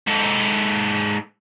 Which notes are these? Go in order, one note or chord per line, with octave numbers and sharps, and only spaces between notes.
G#2 A4